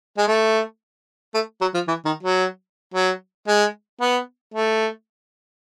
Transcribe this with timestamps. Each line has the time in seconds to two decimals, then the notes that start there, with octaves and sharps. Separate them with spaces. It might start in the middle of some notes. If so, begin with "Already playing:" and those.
0.18 G#3
0.28 A3
1.34 A3
1.61 F#3
1.74 F3
1.88 E3
2.05 D#3
2.23 F#3
2.94 F#3
3.48 G#3
4.01 B3
4.54 A3